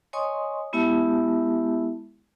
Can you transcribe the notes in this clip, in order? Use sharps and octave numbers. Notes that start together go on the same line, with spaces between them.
C#5 D#5 G#5 C6 C#6 D#6
G#3 B3 E4 G4 E5 A5